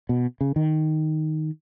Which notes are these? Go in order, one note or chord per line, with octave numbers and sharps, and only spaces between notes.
B2
C#3
D#3